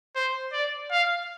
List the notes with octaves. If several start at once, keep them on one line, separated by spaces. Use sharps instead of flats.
C5
D5
F5